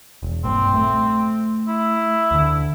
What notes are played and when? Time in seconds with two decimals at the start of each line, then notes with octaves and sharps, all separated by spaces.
0.23 E1
0.44 A#1 G2 A#2 C4
0.74 A3
1.68 E4
2.31 D2 D3